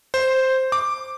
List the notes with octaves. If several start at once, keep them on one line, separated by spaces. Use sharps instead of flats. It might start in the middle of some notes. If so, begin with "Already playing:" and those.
C5
D6